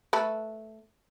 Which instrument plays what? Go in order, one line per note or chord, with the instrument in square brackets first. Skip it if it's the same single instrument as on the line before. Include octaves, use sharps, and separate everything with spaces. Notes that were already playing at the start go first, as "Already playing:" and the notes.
[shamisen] A3 A4 B4